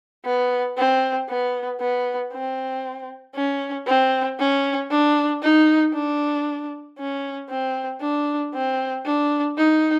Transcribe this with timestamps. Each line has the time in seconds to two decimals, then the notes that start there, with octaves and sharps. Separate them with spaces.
0.25 B3
0.78 C4
1.29 B3
1.80 B3
2.33 C4
3.35 C#4
3.87 C4
4.39 C#4
4.90 D4
5.43 D#4
5.94 D4
6.98 C#4
7.49 C4
8.01 D4
8.53 C4
9.05 D4
9.57 D#4